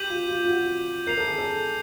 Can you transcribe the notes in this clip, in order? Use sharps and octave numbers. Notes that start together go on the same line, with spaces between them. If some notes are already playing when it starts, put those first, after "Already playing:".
Already playing: G4 D6 G6 B6 D#7 F#7
F4
F4
F4
F#4
A#4 G6 C7 F7
A4
G#4
A4